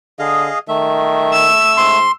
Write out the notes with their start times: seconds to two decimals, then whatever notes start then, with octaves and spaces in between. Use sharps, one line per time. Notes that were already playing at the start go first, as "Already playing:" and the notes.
0.19 D3 G#4 D#5 F5
0.68 D#3 A3 E5
1.32 E6
1.77 G#2 C6